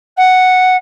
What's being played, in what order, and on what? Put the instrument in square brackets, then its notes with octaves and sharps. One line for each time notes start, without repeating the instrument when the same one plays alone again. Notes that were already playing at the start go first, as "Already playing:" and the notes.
[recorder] F#5